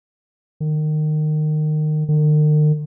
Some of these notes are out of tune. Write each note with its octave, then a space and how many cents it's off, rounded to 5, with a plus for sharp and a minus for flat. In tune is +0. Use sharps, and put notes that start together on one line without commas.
D#3 -25
D#3 -45